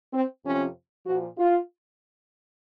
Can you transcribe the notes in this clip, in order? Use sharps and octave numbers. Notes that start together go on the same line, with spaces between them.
C4
F2 C3 F3 C#4
A#2 F3 F#4
F4